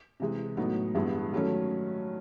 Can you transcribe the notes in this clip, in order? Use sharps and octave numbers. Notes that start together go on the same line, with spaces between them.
C3 E3 G#3
A2 F#3 B3 D#4
G2 E3 G#3 B3 E4
D#3 F#3 A3 C#4